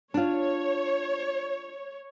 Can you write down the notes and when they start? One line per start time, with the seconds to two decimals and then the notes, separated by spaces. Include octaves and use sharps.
0.14 D4 F4 C#5